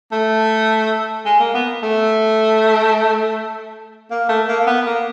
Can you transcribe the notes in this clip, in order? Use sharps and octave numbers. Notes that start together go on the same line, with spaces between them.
A3
G#3
A#3
B3
A3
A#3
A3
A#3
A#3
B3
A#3